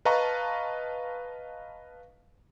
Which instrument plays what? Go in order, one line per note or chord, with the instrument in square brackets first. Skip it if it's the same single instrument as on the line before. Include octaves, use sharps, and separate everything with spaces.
[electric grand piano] B4 D#5 F5 A5 A#5 C#6